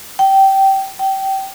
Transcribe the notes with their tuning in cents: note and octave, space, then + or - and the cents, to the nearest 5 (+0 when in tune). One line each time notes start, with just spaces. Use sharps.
G5 -15
G5 -20